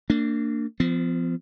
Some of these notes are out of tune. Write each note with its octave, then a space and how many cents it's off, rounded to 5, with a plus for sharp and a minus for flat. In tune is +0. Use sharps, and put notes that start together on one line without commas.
A#3 -30 D4 +0
F3 -15 B3 +45